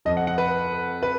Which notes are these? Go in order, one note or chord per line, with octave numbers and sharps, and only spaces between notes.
F2 F3 D#5
F#5
F#5
B4
B4